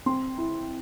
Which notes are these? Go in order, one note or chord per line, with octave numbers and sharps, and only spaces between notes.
C4 C6
E4